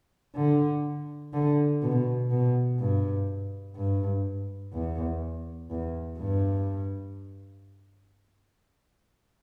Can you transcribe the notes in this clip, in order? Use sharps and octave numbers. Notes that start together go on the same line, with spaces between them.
D3
D3
B2
B2
G2
G2
E2
E2
G2